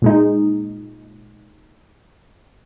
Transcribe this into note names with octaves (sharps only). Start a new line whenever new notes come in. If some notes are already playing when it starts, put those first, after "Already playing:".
A#2 G#3 D#4